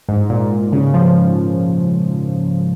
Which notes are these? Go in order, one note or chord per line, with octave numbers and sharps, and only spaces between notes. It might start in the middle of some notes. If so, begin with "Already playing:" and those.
G#2
A#2
C#3
F3